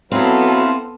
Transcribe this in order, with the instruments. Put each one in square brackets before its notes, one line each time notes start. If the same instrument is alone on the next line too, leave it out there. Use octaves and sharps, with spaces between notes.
[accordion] F#3 [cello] B3 A4 [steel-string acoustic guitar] C4 [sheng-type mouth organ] E4 B4 F5